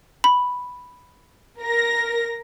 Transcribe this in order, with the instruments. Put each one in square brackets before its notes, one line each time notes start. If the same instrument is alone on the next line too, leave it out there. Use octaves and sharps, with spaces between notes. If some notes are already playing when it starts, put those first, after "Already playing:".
[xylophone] B5
[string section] A#4 A#6